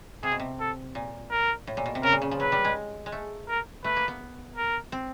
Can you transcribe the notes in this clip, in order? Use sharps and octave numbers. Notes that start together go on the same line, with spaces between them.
C3 G#4
B2
C3
A4
A#2
A#4
A2
A#2
B2
C3
C#3 A#4
A#2
C#3
F3
F#3 B4
G3
G#3
G#3
A3
A#4
A3 B4
A#3
B3
A#4
C4